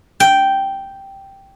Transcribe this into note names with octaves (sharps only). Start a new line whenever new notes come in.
G5